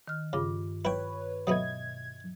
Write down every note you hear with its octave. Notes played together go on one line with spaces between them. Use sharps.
D#3 F6
G2 C#3 F4 D6
E4 B4 C#5 G5
B2 F#3 A3 B3 D#5 E5 D#6 G#6